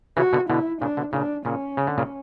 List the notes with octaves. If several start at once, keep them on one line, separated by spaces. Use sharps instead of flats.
C#3 E3 F#4
B2 D3
B2 D3 E4
A#2 C#3 D4
B2 D3
A#2 C#3 D4
A#2 C#3 C#4
C#3
D3
A#2 C#3